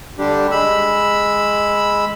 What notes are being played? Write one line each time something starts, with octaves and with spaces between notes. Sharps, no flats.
D3 G3 D4 G4
G#3 B5 E6